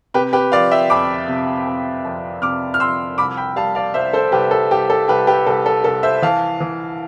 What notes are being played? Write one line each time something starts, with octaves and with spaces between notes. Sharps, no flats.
C3 G4 B4
G4 B4
F3 D5 F5
E5 G5
F2 B5 D6
C3
F2
F2
C3 D6 F6
F6
F3 C6 E6
C2 B5 D6
G5 B5
G3 F5 A5
D5 F5
C2 C5 E5
A4 C5
C2 G4 B4
A4
C2 G4
A4
C2 G4 B4
G4 B4
C2 A4
A4
C2 A4
C5 E5
E3 F5 A5
E3